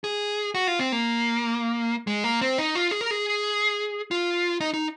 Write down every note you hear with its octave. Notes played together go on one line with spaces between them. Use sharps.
G#4
F#4
F4
C4
A#3
G#3
A#3
C4
D#4
F4
G#4
A#4
G#4
F4
D#4
D#4